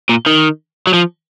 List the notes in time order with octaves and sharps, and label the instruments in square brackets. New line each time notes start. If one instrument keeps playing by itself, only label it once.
[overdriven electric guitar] A#2
D#3
F#3
F3